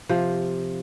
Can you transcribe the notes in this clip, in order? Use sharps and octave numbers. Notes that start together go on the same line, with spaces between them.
C3 F3